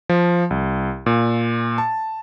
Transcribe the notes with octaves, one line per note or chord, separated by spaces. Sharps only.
F3
C2
A#2
A5